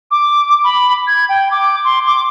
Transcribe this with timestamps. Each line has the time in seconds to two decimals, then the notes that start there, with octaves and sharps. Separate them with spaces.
0.11 D6
0.64 B5
1.07 G#6
1.29 G5
1.51 D6
1.85 C6
2.07 D6